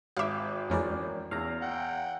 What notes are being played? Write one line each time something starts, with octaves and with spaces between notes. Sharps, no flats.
G#1 E5 F5 D6
F2 E3 G#3 C#4 A#4 D5
E2 F5 A#5
F#5 G5